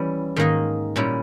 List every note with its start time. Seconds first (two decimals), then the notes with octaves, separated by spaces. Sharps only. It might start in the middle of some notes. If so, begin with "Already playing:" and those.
Already playing: E3 G3 C#4 E4
0.36 G#2 D#3 A#3 D#4
0.96 A#2 G3 C#4 E4